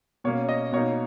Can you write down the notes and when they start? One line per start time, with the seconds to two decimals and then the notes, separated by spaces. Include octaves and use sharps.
0.24 B2 A#3 C#4 C#5
0.49 D#5
0.73 B2 A#3 D#4 C#5